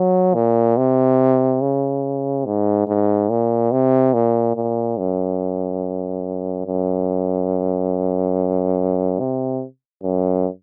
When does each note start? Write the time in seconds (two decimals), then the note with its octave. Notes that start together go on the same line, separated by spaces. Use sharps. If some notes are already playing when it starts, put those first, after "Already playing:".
Already playing: F#3
0.35 A#2
0.77 C3
1.62 C#3
2.46 G#2
2.88 G#2
3.30 A#2
3.72 C3
4.14 A#2
4.56 A#2
4.98 F#2
6.67 F#2
9.20 C3
10.03 F#2